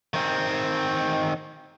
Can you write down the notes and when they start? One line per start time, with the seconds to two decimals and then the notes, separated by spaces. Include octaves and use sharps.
0.14 D#3 C4